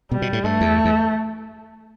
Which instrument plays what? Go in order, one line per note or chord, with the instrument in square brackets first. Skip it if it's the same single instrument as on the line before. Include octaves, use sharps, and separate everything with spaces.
[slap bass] B2 [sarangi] G3
[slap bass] B2
A2
[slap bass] G2 [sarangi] A3
[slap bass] E2
E2